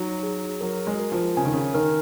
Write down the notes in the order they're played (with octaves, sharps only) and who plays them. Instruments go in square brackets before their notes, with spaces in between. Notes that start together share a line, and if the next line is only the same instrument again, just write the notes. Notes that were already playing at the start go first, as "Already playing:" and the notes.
Already playing: [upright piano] F#3 [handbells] D#4
[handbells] G#4
[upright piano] F#3 [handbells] A#4
[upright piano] G#3
[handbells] A#4
[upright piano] F3
[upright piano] C#3 [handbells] G#5
[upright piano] D#3
C#3
[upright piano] D#3 [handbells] A#4